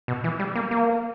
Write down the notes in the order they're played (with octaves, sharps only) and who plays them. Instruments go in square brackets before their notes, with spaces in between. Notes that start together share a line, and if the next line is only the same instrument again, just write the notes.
[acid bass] B2
E3
G3
A#3
A#3